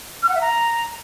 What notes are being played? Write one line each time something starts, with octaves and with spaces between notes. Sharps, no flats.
F6
F#5
E5
A#5